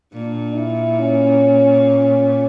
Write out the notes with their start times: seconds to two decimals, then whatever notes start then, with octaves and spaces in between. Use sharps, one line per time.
0.13 A#2 D4
0.57 E4
1.00 C#4